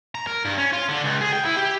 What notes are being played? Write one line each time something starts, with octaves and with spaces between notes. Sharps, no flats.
A#5
A#4
G2
C#4
F4
D3
C#2
G#4
G5
E4
G4